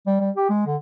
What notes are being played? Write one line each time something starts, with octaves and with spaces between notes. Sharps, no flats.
G3
G3
G4
G#3
D3